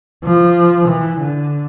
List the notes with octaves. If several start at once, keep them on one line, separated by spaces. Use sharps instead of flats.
F3
E3
D3